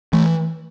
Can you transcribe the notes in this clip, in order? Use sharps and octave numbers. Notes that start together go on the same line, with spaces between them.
E3 A3